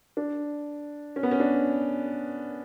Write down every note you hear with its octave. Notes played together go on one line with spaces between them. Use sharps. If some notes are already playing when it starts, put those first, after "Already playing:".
D4
C#4
B3
C#4
D4